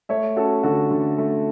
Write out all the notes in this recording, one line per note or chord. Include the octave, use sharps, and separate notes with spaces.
A3 C#5 E5
C#4 F#4 A4
D3 F#4 A4
D3
A3